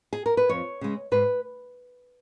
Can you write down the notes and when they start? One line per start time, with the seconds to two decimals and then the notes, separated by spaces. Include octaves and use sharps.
0.13 G#4
0.26 A#4
0.37 B4
0.49 F2 C#5
0.81 C#3 G#3
1.12 G#2 B4